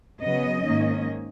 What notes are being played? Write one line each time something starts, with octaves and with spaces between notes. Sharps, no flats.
C#3 F#3 B3 D#5
G#2 D#3 A#3 C#4